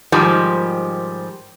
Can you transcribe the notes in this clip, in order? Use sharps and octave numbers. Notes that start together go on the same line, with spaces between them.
G#2 D#3 F3 G3